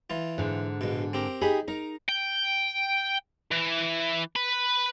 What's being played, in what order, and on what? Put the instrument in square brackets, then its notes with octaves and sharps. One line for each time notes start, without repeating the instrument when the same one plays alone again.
[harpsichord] E3 F4
[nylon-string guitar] G#2 D3
[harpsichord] A#1 B2
C4 G4 A#4
[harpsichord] D#4 B5 [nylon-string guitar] G4 G#4
[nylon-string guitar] D#4 [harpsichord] A#4
[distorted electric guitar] G5
E3
B4 B5